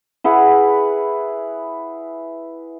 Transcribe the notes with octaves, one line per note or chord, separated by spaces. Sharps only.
E4 G#4 B4 F#5